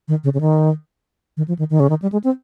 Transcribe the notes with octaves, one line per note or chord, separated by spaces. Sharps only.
D#3
C#3
C#3
D#3
D#3
F3
D#3
D#3
C#3
D#3
G3
G#3
C4